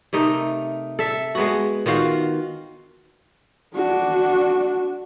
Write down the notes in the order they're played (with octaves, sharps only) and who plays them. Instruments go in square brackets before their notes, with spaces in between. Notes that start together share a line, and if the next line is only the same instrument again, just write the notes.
[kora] C3 A3 D#4 A#4
A4 E5
G#3 B3 F#4
D#3 F4 F#4 F5
[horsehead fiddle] D4 F#4